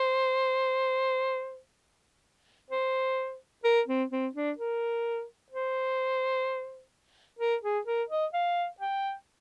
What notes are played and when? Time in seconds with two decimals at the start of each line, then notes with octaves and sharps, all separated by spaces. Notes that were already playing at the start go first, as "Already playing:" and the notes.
Already playing: C5
2.70 C5
3.64 A#4
3.87 C4
4.11 C4
4.35 D4
4.58 A#4
5.52 C5
7.39 A#4
7.63 G#4
7.87 A#4
8.09 D#5
8.33 F5
8.80 G5